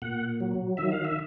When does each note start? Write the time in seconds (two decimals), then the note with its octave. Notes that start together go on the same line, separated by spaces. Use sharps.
0.02 A#2 F#5
0.40 F#3
0.77 D#3 E5
0.91 F5
1.05 E5